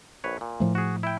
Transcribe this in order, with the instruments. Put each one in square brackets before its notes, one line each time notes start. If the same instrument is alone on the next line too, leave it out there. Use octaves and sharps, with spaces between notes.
[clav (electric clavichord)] A#1 B4 C#5
A#2
[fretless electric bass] A2 F3 A3
[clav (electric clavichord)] F#4 G#4
E4 E5 G5